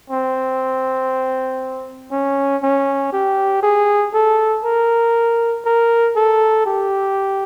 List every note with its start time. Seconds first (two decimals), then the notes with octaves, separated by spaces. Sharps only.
0.10 C4
2.11 C#4
2.63 C#4
3.12 G4
3.63 G#4
4.14 A4
4.64 A#4
5.65 A#4
6.16 A4
6.66 G4